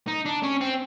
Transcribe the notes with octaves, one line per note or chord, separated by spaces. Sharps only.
D#4
D4
C#4
C4